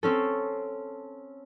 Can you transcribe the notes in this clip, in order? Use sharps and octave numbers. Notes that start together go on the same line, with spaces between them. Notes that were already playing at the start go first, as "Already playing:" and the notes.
C4 C#4 A4